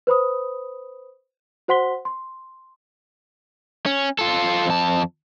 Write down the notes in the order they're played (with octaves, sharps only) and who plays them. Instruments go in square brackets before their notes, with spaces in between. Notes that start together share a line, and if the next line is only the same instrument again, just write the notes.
[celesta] B4 C5 B5 D#6
F#4 C5 F#5 C6 B6 G7
C6
[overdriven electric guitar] C#4
F4 A4
F2 A5